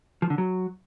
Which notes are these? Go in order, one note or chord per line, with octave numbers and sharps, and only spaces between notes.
F3
D3
F#3